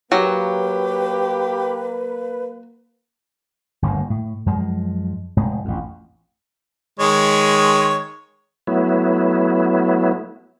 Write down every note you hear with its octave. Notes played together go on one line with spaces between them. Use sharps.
F#3 A#3 G4 B4
G1 D2 G2 A#3
A2
F#2 F3 G#3
F1 A2 G#3
A1 F2
D#3 G#3 C#5
F#3 A3 B3 E4